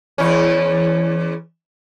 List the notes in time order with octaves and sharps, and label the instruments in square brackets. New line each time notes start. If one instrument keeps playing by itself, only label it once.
[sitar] E2 C#4